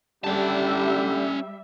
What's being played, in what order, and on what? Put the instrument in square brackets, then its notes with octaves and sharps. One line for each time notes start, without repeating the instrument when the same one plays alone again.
[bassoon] D3 [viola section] G3 E5 [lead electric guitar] C#4 A5 [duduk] G4